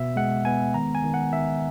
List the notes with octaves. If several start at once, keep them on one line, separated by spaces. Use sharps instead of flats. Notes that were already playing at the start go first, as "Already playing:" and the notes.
Already playing: B2 B3 E5
G#3 F#5
B3 G#5
D#3 A#5
G#5
D#3
F#5
D#3 E5